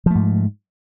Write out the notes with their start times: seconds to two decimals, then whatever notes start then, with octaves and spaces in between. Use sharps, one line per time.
0.06 F3
0.11 A3
0.15 G#2